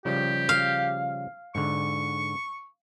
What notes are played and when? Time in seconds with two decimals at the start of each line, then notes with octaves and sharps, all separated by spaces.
0.05 C#3 F3 G3 G4
0.49 F5
1.55 G#2 D3 C#6